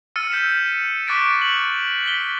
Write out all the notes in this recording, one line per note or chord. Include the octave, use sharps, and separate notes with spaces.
E6 F6 A6 C#7 D#7
G6 B6 E7
C#6 D6 F#6 A6 B6 D7
F#7
A6 B6 G7